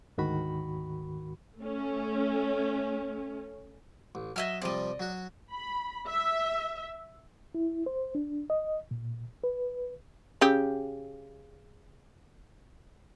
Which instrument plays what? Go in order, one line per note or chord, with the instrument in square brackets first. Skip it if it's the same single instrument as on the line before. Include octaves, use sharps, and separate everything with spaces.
[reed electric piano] D2 G#2 D#3 F#4 B5
[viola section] A3 C#4
[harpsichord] A1
[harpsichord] F#3 [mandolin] D#5 E5 F6
[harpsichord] C3 F3 G3 [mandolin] D5 D#5
[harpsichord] F#3 F#4
[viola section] B5
E5
[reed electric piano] E4
C5
D4
D#5
A#2
B4
[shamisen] C#3 G4